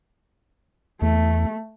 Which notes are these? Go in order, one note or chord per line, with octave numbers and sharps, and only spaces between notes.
E2 A3